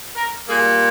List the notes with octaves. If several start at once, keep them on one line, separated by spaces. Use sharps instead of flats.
A#4
A#2 G3 A#3 G#4